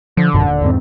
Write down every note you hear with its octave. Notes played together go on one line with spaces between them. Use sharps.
D3 F3
G#1 F#2 B2
D#1
E2 G#2 C4